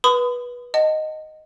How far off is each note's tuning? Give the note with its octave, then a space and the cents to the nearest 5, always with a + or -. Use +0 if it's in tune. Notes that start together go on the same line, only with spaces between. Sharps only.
B4 -20 B5 +45 D#6 +0
D#5 +0 F#5 +25 A5 +25